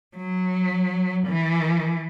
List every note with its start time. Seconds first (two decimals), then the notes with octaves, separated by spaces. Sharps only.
0.17 F#3
1.27 E3